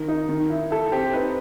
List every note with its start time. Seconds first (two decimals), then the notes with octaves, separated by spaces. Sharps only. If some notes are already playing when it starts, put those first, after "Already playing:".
Already playing: D#3
0.08 D#4
0.29 D#3
0.50 E4
0.71 E4 A4
0.92 C4 G4
1.13 D#4 B4